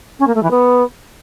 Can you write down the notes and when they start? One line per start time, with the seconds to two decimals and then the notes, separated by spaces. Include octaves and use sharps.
0.19 C#4
0.27 A#3
0.35 A3
0.42 E3
0.50 B3